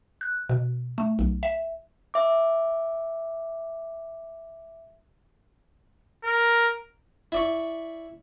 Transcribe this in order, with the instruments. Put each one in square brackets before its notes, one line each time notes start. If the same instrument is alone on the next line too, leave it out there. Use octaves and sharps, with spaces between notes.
[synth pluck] F#6
B2
A3
B1
E5
[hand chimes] E5 D6
[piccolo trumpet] A#4
[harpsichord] E4 D5 C#6